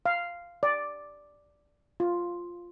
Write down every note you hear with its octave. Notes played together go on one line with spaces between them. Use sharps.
F5
D5
F4